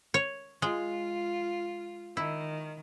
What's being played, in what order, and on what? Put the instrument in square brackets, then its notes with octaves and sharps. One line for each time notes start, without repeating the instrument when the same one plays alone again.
[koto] C#5
[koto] G#3 [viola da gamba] F4
[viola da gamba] D#3 [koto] E4